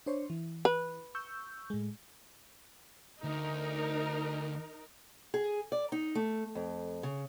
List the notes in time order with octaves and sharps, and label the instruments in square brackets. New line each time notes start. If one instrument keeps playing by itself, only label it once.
[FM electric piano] D4 C5 C#5
E3
[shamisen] B4
[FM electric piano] C#6 E6 G6
A2 G#3
[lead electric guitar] D2 [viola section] D#4 A#4
[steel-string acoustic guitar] G#4
D5
D#4
A3
F2
C#3